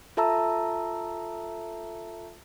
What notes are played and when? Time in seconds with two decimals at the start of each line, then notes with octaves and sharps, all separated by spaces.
0.17 F4 A4 E5 A5 A#5 E6